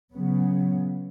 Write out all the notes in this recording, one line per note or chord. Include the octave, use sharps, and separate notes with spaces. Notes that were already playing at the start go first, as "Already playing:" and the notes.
C#3 F#3 B3